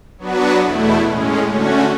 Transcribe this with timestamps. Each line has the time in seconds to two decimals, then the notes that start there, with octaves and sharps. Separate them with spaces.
0.18 F#3 B3 D4 F#4 B4
0.62 E2 B2 A3 E4
1.05 A2 G#3 C#4
1.48 D3 A3 C#4 F#4